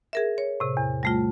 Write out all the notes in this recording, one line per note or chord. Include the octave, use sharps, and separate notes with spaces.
G#4 A#4 E5
C#5
A2 C3
E2
G3 A3 F4